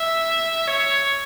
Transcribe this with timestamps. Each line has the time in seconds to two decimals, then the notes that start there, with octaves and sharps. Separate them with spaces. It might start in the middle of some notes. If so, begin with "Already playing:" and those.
Already playing: E5
0.67 C#5